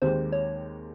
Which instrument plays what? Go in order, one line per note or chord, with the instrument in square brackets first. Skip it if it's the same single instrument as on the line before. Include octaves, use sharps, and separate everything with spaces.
[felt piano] D#2 D#3 G#3 C4 G4 [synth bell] C5
[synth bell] C#5